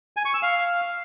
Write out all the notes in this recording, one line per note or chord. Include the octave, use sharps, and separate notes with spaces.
G#5
C#6
E6
F5